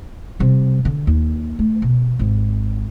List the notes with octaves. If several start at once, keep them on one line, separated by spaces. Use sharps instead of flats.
C3 G3
D3
D#2
A3
B2
G#1